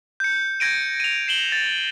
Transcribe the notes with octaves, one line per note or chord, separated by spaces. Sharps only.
G6 C#7
G6 G#6 A#6 D7 D#7
D#7 F7
C7 E7 F#7 G7
A6